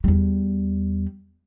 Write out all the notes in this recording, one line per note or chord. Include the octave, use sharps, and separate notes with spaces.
E2 G3